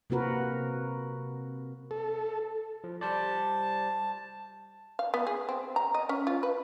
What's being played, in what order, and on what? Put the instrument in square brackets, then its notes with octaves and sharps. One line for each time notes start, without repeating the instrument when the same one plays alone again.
[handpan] C3 A#3 C4 F#4 A#4 B4
[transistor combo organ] A4
[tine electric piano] F3
[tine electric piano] G3 C5 D5 [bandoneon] A5
[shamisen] F5
B3
G#4
C4
A#5
D#5
C#4
F4
B4